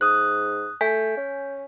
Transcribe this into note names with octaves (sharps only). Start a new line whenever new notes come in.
G#2 D#6 F#6
A3 G#5 G6 B6
C#4